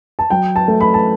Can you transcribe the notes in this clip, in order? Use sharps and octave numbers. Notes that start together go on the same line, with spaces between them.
A5
F#3 G5
A5
A3
B5
A5